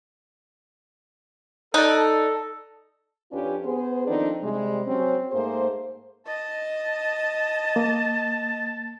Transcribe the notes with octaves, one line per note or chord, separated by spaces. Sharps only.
D#4 A4 D5 F#6
F2 C#4 D4 F4 G4 B4
B3 G#4 C5
D#3 F3 C4 D4 D#4 A4
C3 G3 G#3
F#3 C4 C#4
G#2 A3 A#3 G#4 C5
D#5 A5
A#3